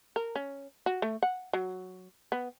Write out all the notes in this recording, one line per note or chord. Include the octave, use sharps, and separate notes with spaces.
A#4
C#4
F#4
A3
F#5
F#3
B3